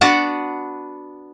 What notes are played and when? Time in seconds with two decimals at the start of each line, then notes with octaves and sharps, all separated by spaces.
0.01 B3 D4 F#4 D5 F#5